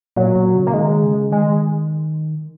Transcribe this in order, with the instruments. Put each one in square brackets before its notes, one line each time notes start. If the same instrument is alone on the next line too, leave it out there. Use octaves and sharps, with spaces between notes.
[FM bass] A#2 [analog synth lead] F#3
[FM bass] A#2
C#3
[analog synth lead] A#3
[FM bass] D#3 [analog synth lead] G#3
[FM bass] C#3
[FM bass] D#3 [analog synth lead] G#3